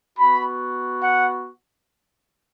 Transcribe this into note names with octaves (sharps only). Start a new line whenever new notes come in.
B3 F#4 B5
F#5